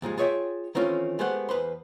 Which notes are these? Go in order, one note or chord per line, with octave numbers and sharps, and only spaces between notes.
D#2 G#2 F3 G#3
F4 G#4 C#5 D#5 E5 G5
D#3 E3 A3 C4 C#4 F4
G#3 A3 B3 G4 C5 F#5
E2 B4 C5 C6